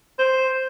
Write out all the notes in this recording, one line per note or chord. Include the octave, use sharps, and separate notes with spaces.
C5